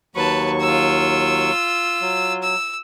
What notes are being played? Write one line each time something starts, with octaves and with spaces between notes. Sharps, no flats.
D#2 F#3 B4 A5 C#6
F4 E6
F#3
E6